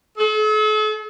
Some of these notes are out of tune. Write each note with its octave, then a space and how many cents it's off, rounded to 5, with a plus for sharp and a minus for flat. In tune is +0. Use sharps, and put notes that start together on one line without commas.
A4 -45